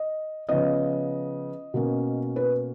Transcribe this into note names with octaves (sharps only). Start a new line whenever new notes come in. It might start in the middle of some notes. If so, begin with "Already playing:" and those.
Already playing: D#5
C#3 F3 B3 D#5
B2 A#3 C#4
B4